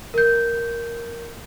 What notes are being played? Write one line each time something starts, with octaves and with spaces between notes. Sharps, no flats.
A#4 G6